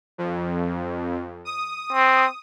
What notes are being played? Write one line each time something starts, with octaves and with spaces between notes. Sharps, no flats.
F2
D#6
C4